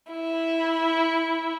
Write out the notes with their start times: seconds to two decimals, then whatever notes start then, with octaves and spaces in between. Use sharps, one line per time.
0.11 E4